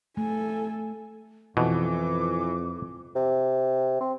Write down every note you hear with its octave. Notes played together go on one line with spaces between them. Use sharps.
A3 A4 G#5
F2 B2 E3 D6
C3
C4